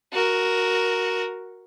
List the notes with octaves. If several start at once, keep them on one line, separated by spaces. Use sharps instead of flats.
F#4 A#4